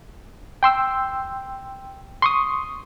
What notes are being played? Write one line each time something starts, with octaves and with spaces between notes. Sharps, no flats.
G5 C6 E6
C6 C#6 D#6